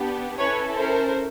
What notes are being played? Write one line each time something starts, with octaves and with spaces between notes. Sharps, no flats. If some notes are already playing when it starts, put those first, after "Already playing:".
Already playing: B3 D4 G4
C#4 E4 A4 B4 C#5
A#4 C5